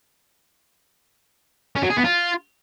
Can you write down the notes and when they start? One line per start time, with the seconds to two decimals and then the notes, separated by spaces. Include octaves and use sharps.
1.76 C#4
1.83 F#3
1.90 G#4
1.97 B3
2.04 F4